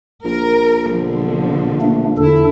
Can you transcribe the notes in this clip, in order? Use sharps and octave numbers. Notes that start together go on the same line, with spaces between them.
A#1 A#4
B2 D3 F3
A3 A#3 D4
E2 D3 D4 E4 A4